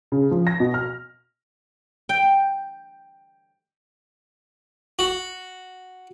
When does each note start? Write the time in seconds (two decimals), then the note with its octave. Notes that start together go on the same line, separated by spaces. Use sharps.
0.12 C#3
0.31 F3
0.47 A#6
0.60 B2
0.74 F6
2.09 G5
4.99 F#4